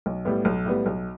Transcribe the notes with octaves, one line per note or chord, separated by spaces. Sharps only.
B1
A2 G3 B3
B1
A2 G3 B3
B1